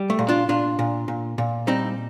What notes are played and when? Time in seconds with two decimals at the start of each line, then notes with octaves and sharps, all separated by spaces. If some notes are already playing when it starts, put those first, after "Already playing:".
Already playing: G3
0.10 A3
0.19 A#2
0.28 D4 F4
0.49 A#2 D4 F4
0.79 A#2
1.08 A#2
1.38 A#2
1.67 G3 C4 D#4